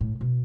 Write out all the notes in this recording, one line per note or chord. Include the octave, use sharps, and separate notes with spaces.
A2
B2